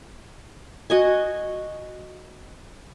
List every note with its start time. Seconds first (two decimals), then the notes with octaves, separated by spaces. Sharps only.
0.90 F#4 D#5 G#5